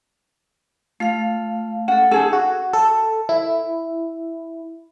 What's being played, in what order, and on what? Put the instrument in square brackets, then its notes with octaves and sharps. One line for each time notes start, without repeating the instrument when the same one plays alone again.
[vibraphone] A3 F5 [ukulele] F4
[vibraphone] C#4 A4 [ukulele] F#5
[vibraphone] C#4 F#5 [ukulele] D#4 G#4 A4
[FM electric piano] F#4
A4
E4